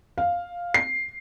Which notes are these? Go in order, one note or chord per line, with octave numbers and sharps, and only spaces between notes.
F5
C7